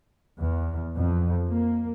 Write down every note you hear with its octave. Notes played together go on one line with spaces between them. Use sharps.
E2
F2
A#3